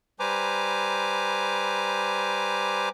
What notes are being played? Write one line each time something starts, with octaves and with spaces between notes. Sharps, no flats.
G3 B4 C5 G#5 A#5 D6